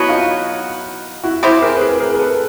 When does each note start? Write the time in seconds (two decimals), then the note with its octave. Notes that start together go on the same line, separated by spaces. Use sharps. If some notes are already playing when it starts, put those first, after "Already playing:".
Already playing: B2 F#3 B3 E4 F#4
0.09 D#4 F4
1.23 E4 F#4
1.43 G#3 C4 E4 G4
1.62 G#4 A#4
1.77 B4
1.81 G#4 A#4
2.00 G#4 A#4
2.14 A#4
2.19 A4 B4